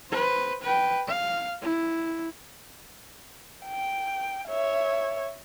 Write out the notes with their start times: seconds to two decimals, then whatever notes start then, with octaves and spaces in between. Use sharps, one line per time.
0.10 B4 C5
0.63 B4 G5
1.07 F5
1.62 E4
3.65 G5
4.48 C#5 E5